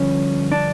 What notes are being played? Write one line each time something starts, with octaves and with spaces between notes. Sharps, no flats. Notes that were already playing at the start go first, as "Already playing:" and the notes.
Already playing: G2 D3 F3 C#4
D4